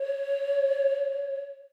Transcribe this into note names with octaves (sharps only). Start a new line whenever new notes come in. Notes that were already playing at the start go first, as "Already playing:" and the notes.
Already playing: C#5